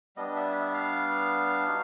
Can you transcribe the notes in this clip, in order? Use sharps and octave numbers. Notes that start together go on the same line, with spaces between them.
G3 B3 D4 D#5
E5
E5
F5
D#4 F#4